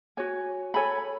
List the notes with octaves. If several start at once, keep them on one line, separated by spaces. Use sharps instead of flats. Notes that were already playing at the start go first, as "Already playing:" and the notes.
F#4 C#5 G#5
A4 C#5 G#5 B5